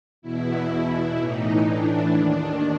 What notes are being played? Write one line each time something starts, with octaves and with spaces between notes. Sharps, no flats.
E2 B2 E4
A2 E3 D#4
D4
D#2 D#3